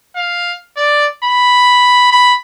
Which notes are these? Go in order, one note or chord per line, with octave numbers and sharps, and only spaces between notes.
F5
D5
B5
B5